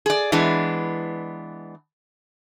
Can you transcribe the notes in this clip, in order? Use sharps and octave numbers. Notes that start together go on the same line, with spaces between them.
G#4 D5
E3 G#3 B3 D4